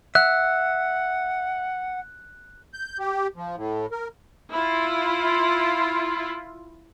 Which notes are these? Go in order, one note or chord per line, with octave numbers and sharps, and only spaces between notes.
E5 F#5 F#6
G6
G4
F3
A2
A#4
E4 F4